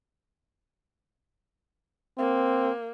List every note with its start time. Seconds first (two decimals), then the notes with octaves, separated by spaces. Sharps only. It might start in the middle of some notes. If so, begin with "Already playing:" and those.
2.18 A#3 C4